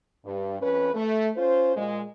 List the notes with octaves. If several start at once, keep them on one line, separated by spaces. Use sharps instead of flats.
G2
F2 C#4 B4
A3
C#4 F4 C5
A#2 G#3